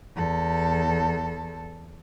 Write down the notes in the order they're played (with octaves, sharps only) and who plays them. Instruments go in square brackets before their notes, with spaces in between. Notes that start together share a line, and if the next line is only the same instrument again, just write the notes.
[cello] E2 A4